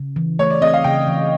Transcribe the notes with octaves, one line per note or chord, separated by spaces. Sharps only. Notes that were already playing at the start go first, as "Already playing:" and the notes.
Already playing: C#3
E3
A3 C#5
D5
C4 D#5
F5
C#3 G5
E3